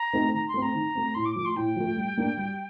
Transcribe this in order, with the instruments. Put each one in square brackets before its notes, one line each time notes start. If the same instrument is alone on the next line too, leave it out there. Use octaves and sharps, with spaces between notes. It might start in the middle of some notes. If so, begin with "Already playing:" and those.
Already playing: [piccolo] A#5
[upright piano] A3 C4 D#4
[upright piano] D#3 [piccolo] A#5
[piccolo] C6
[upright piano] A3 C4
[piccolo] A#5
[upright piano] D#3
A3 C4
[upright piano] A2 [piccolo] C6
[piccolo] D6
[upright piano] F3 A3 [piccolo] D6
[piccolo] C6
[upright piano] A2 [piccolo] G5
[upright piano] F3 A3
G3
A#3 D4
G3